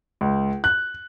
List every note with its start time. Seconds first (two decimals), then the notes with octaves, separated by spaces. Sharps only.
0.21 C#2
0.64 F#6